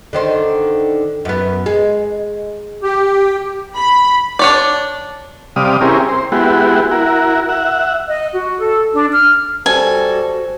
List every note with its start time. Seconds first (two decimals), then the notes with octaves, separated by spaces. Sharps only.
0.13 D3 D#3 C5
1.25 F#2 B3
1.66 G#3
2.83 G4
3.77 B5
4.39 D4 C#5 D5
5.56 C3 G3 D5 F5 D#6
5.81 C4 C#4 E4 G4 G#4 A#4
6.09 C5
6.32 G#3 B3 E4 F#4 G4
6.91 E4 F#4 A#4
7.49 E5 F#5
8.10 D#5
8.34 F#4
8.59 A4
8.94 D4
9.12 F6
9.66 G3 F#4 A4 C5 G#5